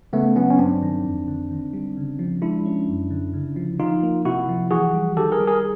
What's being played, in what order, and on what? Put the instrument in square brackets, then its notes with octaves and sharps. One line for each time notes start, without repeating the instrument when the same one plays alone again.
[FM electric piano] C#3 [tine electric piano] A3 B3
[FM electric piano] F#3 [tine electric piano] B3 C#4
[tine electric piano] C#4
[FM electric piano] G2 [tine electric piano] C4 D4
[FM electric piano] D#3
F2
D3
D#3
G3
C#3
F3
[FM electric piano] G#3 [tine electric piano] D4 E4
[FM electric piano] C#4
F#2
D3
C#3
F3
[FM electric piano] F3 [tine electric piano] D#4 F4
[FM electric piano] A#3
[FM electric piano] C3 [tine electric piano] E4 F#4
[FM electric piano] F3
[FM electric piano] E3 [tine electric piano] F#4 G#4
[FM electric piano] G3
[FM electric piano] D#3 [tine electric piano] G4 A4
[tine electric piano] G#4 A#4
[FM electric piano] G3
[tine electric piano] G#4 A#4